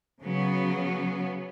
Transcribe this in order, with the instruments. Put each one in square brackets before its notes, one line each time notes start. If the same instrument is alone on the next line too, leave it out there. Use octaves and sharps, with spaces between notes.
[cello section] C#3 F#3 B3